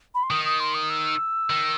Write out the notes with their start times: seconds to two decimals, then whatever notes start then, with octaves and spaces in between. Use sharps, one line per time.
0.14 B5
0.23 C6
0.30 D#3 D#6
0.45 D#6
0.60 C6
0.74 D#6
0.89 E6
1.50 D#3